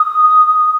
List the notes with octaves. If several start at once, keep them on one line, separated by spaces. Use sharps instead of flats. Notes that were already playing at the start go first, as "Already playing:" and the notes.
Already playing: D#6